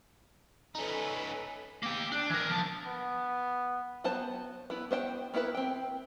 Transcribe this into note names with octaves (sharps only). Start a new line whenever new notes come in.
C#4 D#4 A4 B4
A#3 G5
D4
E3 A#4
F3 A5
B3
F#3 B3 C5 A5
B3 E4
B3 C5 E5 G5
A#3 B3 E4 F#4 B4
C4 G5